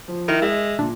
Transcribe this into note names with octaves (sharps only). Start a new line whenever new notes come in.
F3
D#3 E4 A#4
G#3 E5
A#2 D4